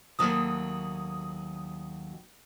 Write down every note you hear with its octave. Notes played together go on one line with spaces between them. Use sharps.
D#2 F#3 A3 D#6